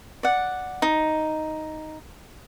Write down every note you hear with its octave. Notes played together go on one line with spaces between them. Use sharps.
D5 F#5
D#4